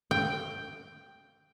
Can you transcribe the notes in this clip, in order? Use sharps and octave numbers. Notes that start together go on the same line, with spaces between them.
G5